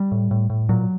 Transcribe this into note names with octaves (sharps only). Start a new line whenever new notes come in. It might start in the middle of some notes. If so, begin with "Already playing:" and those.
Already playing: G3
A2
A2
A2
A#2 F#3